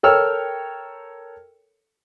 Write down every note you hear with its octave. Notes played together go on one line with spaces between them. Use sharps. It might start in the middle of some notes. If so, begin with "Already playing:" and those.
A4 A#4 C#5 G5 E6 F6